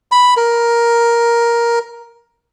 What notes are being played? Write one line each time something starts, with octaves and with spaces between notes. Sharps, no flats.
B5
A#4